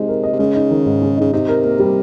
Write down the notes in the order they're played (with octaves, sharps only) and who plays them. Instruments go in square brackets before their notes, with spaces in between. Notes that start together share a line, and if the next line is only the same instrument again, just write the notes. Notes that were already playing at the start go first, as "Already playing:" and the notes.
Already playing: [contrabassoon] C3 [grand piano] G#3 D#4
[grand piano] A#4
D#5
[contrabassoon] C3
[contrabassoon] C#3 [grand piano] G#3
[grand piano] D#4
D#3
G#2
G#3
[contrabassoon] C#3 [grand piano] D#4
[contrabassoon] C3 [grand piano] D#4
[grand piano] A#4
A#3
G3